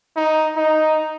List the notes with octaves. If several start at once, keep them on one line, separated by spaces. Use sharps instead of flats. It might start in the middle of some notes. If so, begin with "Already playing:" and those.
D#4
D#4